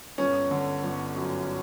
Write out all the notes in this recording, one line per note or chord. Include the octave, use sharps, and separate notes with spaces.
G1 C#4
D3
G1
F#2